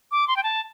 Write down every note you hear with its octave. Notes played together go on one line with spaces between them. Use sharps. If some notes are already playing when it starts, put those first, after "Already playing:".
D6
C6
G5
A5